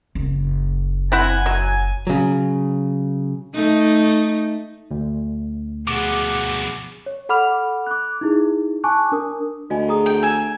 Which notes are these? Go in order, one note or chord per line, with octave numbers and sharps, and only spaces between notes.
F#1
C4 E4 F#5 G#5
F#3
C#3 F#3
A3 D#4
D2
B2 F3 G#4 F#5 D6
C#5
A4 F#5 B5 D6 F6 F7
D6 F#6
D#4 E4 G#4
G#5 A5 C#6 D6 F#6
D4 A#4 D#6
D2 F#4 D#5 G#5
G#4 A#5 D#6
G5
G#5 E6 E7